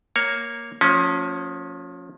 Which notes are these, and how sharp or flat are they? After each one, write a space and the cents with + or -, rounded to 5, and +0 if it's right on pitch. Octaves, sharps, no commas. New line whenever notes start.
A#3 +0 C#5 +5
F3 +30 A#3 -40 C#4 +0